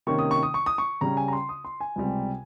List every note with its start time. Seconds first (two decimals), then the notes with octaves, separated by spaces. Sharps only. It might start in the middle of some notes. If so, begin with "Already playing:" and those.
0.07 C3 D#3 A#3 C#4 C#6
0.19 D#6
0.31 C#6
0.43 D#6
0.54 C#6
0.66 D#6
0.78 C#6
1.01 C#3 G3 C#4 A#5
1.17 G#5
1.28 A#5
1.33 C6
1.49 D#6
1.65 C6
1.80 G#5
1.96 C#2 C3 G3